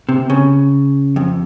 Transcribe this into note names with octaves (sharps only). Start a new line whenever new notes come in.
C3
C#3
F2